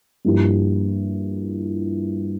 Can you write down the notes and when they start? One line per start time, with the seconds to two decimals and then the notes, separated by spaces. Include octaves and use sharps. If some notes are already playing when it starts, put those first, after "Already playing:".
0.25 G2 F3 A#3 E4 G4